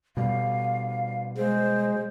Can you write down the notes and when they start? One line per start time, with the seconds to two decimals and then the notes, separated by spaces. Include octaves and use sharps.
0.17 B2 G3 F5
1.38 G#3 C5